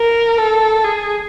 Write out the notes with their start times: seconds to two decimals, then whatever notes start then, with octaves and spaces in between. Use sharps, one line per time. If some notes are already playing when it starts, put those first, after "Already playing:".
Already playing: A#4
0.38 A4
0.84 G#4